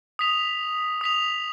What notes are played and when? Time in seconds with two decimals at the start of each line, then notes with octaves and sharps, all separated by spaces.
0.19 D#6 B6 F7
1.01 D#6 B6 F7